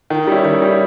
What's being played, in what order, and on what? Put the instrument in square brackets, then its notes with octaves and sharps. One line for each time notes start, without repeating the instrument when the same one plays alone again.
[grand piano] D#3
G3 C#4 E4
D#3
G3 C#4 E4